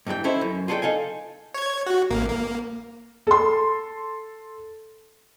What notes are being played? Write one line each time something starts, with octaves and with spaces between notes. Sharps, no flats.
G2 E3 A#4 G5
C#4 D#4 E4 A4 C5
F#2
F4 G#4 A4 C#5 D5 G5
D#4 A4 F5 G#5
C#5 G#6
F#4
A1 A#3
A#3
A4 C6